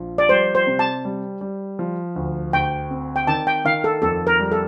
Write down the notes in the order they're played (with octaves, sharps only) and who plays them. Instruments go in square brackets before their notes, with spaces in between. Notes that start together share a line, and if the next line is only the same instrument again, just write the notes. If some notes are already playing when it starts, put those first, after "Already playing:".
Already playing: [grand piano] A#1 F3
[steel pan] D5
[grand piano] G3 [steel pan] C5
[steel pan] C5
[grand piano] C3
[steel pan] A5
[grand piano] G3
G3
F3
D2
[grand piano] D2 [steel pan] G5
[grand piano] C4
[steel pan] G5
[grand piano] D#3 [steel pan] A5
[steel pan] G5
[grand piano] D#3 [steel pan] F5
[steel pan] A4
[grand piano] F2 [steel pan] A4
[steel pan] A#4
[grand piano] G3
[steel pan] A4